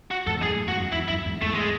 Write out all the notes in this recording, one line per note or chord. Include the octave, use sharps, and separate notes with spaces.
F#4
E2 G#2 A4
C3
F#2 A2 G#4
F#2 A2
E2 G#2 F#4
F#2
E2 E4
F#2 E4
E2 G#2
E2 G#2 A3
G#3